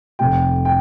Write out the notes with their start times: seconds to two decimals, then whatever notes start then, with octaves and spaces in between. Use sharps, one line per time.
0.19 F1 F2 C3 G3 G5
0.65 G5